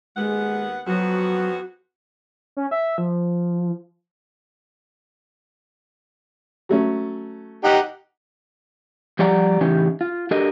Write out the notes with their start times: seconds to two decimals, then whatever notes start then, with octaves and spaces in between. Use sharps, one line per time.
0.16 D#2 G#3 B3 F#5
0.87 F2 F#3 B3 F#4
2.57 C#4
2.71 E5
2.98 F3
6.69 F#3 A3 C#4
7.64 D#4 G4 F#5
9.19 F3 G3 G4 D5 F#5 A#5
9.60 A2 C#3 E3 C#4 D#4 G4
10.01 F4
10.31 D4 F#4 G4 A4 A#4 D#5